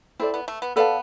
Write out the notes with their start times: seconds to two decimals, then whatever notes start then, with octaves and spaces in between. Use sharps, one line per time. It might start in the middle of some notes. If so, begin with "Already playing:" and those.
0.20 C4 E4 A4 D5
0.34 B3
0.48 A3
0.62 B3
0.76 B3 A4 D5 F5 A5